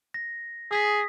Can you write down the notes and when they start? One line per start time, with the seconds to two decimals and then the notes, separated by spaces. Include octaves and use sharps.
0.14 A#6
0.71 G#4 D#6 B6